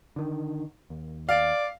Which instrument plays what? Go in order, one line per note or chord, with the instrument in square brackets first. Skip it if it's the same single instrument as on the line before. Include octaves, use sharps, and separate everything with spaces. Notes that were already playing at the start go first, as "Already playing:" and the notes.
[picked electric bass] D3 D#3
D#2
[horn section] D5 [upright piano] F5